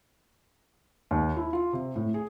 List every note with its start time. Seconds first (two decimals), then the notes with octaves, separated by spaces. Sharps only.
1.11 D#2
1.37 E4
1.53 F4
1.73 C3
1.96 A2
2.14 G#4